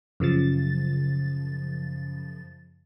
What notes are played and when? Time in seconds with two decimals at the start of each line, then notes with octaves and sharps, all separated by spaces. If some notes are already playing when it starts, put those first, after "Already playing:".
0.20 F#2 C#3 F3 A6